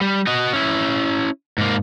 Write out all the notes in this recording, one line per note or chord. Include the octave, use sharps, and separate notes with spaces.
G3
F#4 D#5
C#4 E4
G#2 A#3